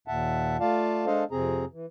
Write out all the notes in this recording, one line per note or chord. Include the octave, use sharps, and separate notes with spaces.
D#2 A#2 E5 F#5 A5
A3 F4 D5 F5 A5
G#3 D4 A4 C5 D#5 F5
F2 C3 C4 G#4 A#5
E3